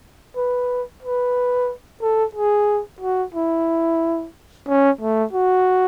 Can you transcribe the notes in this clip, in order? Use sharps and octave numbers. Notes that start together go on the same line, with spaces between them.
B4
B4
A4
G#4
F#4
E4
C#4
A3
F#4